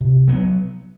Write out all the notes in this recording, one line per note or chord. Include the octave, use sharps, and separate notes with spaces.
C3
F#3 B3